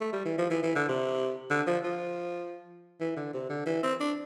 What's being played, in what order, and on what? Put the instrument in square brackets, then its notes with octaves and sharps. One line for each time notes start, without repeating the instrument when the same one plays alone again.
[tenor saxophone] A3
G3
E3
F3
E3
E3
D3
C3
D3
F3
F3
E3
D3
C3
D3
E3
C4
D4